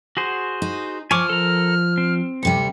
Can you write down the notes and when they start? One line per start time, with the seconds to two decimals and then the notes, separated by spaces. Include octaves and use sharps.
0.17 F#4 G#4 C5
0.62 D#4
1.11 F3 G#5 C#6 D6 F6
1.30 A4 A#4
1.98 C4
2.43 D2 C3 G3 C#7